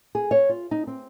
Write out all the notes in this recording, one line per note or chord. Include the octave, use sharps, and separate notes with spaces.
G#4
C#5
F4
D#4
C4